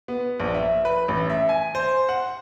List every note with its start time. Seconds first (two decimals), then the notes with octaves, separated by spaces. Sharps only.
0.08 B3
0.40 A#1
0.54 E5
0.85 B4
1.08 A1
1.30 E5
1.49 G#5
1.75 C5
2.09 F#5